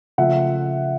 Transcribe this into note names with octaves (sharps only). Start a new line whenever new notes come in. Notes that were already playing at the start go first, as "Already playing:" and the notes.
C#3 F3 A3 E5 F#5